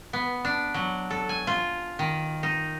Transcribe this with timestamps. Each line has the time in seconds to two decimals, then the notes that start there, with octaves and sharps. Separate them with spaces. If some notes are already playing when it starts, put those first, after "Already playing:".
0.13 B3
0.45 D4
0.74 F#3
1.10 A4
1.29 G#5
1.47 F4
1.99 D#3
2.43 D#4